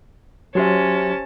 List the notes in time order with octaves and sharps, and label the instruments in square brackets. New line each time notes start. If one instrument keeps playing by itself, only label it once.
[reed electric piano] F#3 G#5 C6 [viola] C#4 A5 [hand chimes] G4 C5 E5